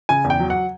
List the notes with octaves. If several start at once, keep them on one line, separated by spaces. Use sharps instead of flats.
C#3 G#5
E2
G5
F#3
F#5